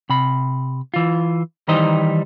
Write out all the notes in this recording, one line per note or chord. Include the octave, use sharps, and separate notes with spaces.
C3 B5
E3 F4
D#3 E3 G3 D#4 C5 D#5